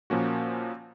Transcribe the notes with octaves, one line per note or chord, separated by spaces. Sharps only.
A#2 F3 A#3 C#4 F#4